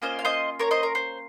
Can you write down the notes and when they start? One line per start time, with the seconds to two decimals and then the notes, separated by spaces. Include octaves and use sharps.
0.02 A#3 C#4 F4 C5 D#5
0.19 F5
0.25 C5 D#5
0.59 A#4 C#5
0.71 C5 D#5
0.83 A#4
0.95 C5